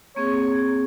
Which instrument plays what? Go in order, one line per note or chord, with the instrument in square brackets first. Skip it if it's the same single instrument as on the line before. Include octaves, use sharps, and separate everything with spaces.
[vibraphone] A#3 C4 G#4 [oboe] C#5